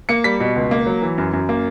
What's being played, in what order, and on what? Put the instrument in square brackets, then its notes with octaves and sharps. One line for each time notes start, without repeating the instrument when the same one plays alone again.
[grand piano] A#3 C#7
G3 B6
B2
C#2
A#3
F#3
E3
F#2
F#2
A#3